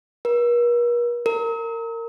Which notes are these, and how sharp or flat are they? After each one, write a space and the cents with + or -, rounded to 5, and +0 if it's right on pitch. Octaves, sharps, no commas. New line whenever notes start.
A#4 +45
A#4 -25